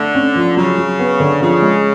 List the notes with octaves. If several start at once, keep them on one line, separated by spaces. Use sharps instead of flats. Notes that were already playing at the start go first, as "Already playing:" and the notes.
Already playing: D3 A3
C#4
F3
C#3 F#3
F#3
B3
D3
C#3 F3
G#3